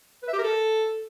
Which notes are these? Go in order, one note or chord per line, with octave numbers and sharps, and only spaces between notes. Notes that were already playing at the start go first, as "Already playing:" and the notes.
B4
E5
G4
A#4
A4